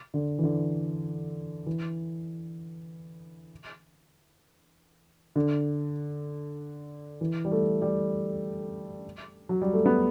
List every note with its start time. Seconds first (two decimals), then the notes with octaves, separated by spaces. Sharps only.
0.14 D3
0.39 E3
0.43 D3
1.66 E3
5.36 D3
7.21 E3
7.45 G3
7.52 A3
7.82 G3
9.49 F#3
9.62 G3
9.74 A3
9.86 B3